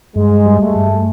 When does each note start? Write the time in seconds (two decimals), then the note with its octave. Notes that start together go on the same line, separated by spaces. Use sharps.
0.16 G2 G#3
0.46 G3
0.60 A3
0.76 G2